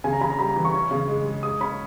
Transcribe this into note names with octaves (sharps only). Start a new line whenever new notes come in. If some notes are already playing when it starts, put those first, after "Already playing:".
C#3 G#5
A#5
C#3 B5
A#5
G3 B5
A#5
E3
C#6
C#4
C#3
G#3
G#3
G#4 D#6
C#4 B5